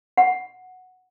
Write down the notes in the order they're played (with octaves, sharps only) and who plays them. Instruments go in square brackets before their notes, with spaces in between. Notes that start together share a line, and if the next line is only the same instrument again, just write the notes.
[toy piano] F#5